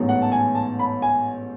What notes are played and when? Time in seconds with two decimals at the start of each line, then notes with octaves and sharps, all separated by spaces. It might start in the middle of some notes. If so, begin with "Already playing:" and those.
Already playing: A1 G#2 F#3 B3
0.09 F#5
0.22 A5
0.32 G#5
0.55 A5
0.79 B5
1.02 G#5